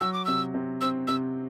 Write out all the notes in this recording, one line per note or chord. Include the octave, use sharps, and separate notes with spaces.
F#3 E6
D6
C3 E6
C3
C4 E6
C3 E6